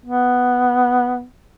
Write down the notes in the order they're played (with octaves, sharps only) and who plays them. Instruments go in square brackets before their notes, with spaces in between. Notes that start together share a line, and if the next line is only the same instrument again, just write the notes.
[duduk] B3